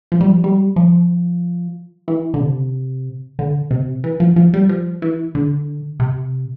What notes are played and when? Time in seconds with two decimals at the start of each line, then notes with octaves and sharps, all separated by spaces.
0.12 F3
0.21 G3
0.29 F3
0.44 G3
0.76 F3
2.08 E3
2.34 D3
2.40 C3
3.39 D3
3.71 C3
4.04 E3
4.20 F3
4.36 F3
4.54 G3
4.69 F3
5.02 E3
5.35 D3
6.00 C3